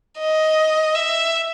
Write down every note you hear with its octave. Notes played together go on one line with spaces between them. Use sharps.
D#5
E5